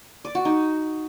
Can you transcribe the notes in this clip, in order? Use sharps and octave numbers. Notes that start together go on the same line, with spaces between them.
D5
F#4
D#4